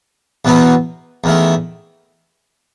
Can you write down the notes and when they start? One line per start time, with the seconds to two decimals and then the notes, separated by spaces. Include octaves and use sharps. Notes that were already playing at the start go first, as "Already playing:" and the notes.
0.45 E2 B2 F#3 B3
1.24 E2 D#3 A3